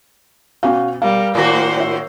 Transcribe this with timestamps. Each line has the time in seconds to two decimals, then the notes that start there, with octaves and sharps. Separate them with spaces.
0.63 B2 C#4 F#4 F5
1.02 G3 A#4 F5
1.35 A2 D#3 A#3 F#4 C5
1.76 C#5 E5